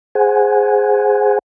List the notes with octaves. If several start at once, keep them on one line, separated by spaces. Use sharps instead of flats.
G#4 C5 F#5 G#5